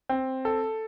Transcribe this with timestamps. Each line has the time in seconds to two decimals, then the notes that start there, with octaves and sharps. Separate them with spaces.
0.09 C4
0.45 A4